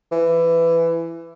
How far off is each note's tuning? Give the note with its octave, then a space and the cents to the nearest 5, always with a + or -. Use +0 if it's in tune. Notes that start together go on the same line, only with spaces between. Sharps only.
E3 +15